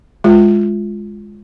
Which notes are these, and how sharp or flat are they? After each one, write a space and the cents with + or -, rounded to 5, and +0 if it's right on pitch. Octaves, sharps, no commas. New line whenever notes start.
G#3 +0 F4 +0